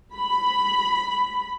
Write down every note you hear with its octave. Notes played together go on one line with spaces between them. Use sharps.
B5